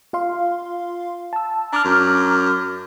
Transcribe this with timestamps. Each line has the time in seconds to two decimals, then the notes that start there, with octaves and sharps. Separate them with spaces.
0.13 F4 F5 C6
1.33 A5 E6
1.73 D4 A#5 D6 F6
1.84 F#2